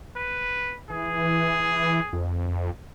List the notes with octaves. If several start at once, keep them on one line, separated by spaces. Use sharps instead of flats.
B4
E3 G#4
F2